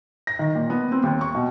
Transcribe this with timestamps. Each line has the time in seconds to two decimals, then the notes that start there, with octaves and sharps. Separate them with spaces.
0.27 A#6
0.39 D#3
0.55 A#2
0.70 B3
0.92 C4
1.03 D#2
1.21 C#6
1.35 B2